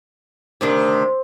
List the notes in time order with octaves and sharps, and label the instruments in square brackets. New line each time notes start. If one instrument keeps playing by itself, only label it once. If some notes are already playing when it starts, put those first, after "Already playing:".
[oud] D2 D#3 D4 [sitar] C3